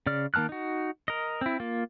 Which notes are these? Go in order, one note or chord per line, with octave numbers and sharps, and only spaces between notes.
C#3 D5 F6
D#3 A#3 A5 F6 F#6
D#4 F#4
A#4 D#5
C4 E4
A#3 F4